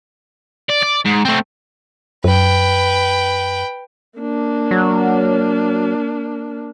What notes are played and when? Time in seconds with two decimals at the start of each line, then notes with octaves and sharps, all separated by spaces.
0.70 D5
0.83 D5
1.06 G#2
1.25 A3 C4
2.24 F#2 B4 G5
4.19 A#3 D4
4.71 F#3